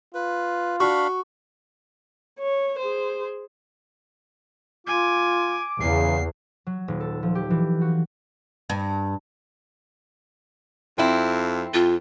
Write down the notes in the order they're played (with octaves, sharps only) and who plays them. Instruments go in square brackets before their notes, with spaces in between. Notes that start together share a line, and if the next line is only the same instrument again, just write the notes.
[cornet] F4 [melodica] B4
[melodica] D4 F5 B5 [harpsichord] F#4 [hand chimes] C#6
[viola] C#5
G#4 C5
[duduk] F4 [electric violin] G#5 [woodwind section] D6
[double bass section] E2 [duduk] C#3 [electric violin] C7
[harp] F#3
D#1
A4
F3
G4
E3
F#4
[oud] G2
[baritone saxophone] F2 [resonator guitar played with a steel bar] C4 E4
[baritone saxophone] F2 [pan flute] F4